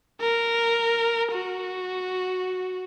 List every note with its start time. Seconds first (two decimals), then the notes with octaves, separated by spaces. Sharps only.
0.21 A#4
1.32 F#4